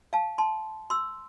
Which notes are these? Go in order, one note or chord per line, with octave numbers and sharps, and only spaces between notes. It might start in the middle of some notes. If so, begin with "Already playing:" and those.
F5 A5
A5 C6
C6 E6